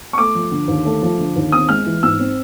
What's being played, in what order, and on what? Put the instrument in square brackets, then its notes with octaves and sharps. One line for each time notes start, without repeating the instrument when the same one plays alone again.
[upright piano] C#6
A3 D6
F3
D3
D#2
A3
F3
D3
D#2
C4 D#6
G#3 F6
E3
G#2 E6
C4